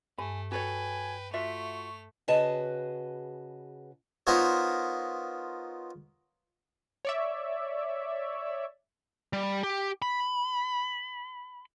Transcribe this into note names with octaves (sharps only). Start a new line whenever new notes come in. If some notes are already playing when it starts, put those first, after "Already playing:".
G2 A3 G#5
F#4 A4 B4 C#5 G5 G#5
A3 F4 F#4 E5 C#6 F7
C#3 F#4 G#4 B4 D#5 A5
B3 D#4 F4 A#4 C5 C#5
C#5 D5 E5
G3
G4
B5